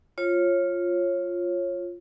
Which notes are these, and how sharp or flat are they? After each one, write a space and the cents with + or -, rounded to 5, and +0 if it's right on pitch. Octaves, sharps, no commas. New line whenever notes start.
F4 +0 C#5 -25